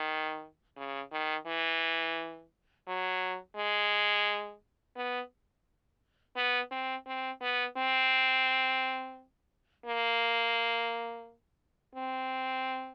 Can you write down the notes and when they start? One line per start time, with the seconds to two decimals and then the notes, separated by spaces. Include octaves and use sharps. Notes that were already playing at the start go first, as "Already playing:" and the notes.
Already playing: D#3
0.77 C#3
1.12 D#3
1.46 E3
2.87 F#3
3.57 G#3
4.96 B3
6.36 B3
6.71 C4
7.06 C4
7.41 B3
7.77 C4
9.86 A#3
11.95 C4